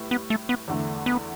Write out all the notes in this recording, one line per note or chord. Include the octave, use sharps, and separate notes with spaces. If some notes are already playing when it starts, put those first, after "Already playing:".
Already playing: A2 G3 B4
B3
A3
B3
E2 D3 A3
B3